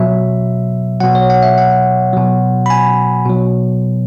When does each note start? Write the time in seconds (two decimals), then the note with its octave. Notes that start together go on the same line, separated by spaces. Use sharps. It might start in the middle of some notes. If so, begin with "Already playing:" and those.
Already playing: B2 F#3 E5
1.00 B2 F#3 F#5
1.15 C#5
1.30 F#5
1.43 E5
1.58 F#5
2.13 B2 F#3
2.66 B5
2.70 G#5
3.26 B2 F#3